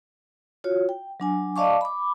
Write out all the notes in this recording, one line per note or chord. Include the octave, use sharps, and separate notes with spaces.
F4 F#4 C#5
G5
F#3 D4 G#5
D5 D#5 F5 A5 C#6 D6
B5 D6